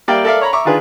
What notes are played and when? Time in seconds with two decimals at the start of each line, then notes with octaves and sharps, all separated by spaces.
0.08 G3 A#3 D5 E5 F5 G5
0.25 A4 A#4 D5 E5 F5
0.41 C#5 A#5 B5
0.53 E5 A#5 C#6 D6
0.65 D#3 D4 F4 G#4 B4